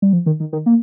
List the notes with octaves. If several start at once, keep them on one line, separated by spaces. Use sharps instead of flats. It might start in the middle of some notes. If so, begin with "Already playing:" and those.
G3
F3
D#3
D#3
D#3
A#3